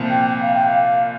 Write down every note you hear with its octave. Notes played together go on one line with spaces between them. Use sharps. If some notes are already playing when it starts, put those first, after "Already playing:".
Already playing: C2 A#2 F3
G5
G5
F5
G5
F5